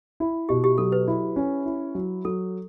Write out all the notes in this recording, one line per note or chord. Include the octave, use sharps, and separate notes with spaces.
E4
B2 G4
G4
F#3 A4
B4
E4
C#4
E4
F#3
F#3 A4